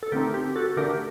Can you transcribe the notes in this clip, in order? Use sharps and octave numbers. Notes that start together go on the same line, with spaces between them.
A4
D3 A3 C4 D#4 G4 A#4
G4
F#4 A4
D3 A3 D4 G4 A#4